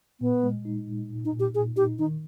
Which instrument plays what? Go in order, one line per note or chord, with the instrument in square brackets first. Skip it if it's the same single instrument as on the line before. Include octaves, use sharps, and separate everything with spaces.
[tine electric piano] A#2 [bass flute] B3
[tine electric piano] G#3
D#4
A#2
A#2
[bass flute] D#4
[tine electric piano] A#2
[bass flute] G4
[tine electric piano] A#2 [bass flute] G#4
[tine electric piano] D#4 [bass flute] G4
[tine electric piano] D#3 [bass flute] D#4